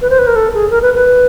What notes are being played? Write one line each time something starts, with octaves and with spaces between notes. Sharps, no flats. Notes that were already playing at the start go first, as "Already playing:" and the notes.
B4
C5
B4
A#4
A4
G#4
A#4
B4
B4